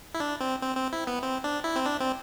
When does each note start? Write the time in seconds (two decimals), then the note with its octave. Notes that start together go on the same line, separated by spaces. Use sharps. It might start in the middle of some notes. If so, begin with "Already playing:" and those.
0.15 E4
0.20 D4
0.41 C4
0.62 C4
0.77 C4
0.93 E4
1.07 B3
1.23 C4
1.44 D4
1.64 E4
1.76 C4
1.86 D4
2.00 C4